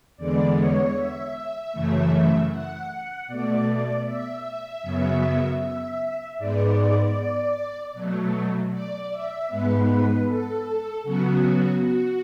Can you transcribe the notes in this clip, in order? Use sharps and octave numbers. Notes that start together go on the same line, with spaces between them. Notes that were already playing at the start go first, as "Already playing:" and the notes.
E2 D3 G#3 B3 D5
C#5
E5
F#2 C#3 E3 A3
F#5
B2 A3 D5
E5
F#2 C#3 F#3 B3
E5
G#2 G#3 B3 D5
B2 F#3 A3
D5
E5
G#2 G#3 B3 B4
A4
C#3 F#3 B3 F#4
F#4